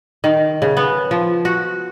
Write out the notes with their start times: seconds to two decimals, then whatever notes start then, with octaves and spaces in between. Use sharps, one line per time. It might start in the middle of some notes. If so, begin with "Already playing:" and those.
0.24 D#3
0.62 C#3
0.77 B3
1.11 F3
1.45 F#4